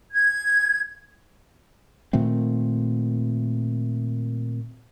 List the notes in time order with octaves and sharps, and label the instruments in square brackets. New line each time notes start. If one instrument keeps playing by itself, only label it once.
[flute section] G#6
[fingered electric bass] A#2 D#3 A3 C4